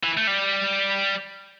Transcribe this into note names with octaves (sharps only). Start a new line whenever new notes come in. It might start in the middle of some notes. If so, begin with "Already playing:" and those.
E3
A3
G3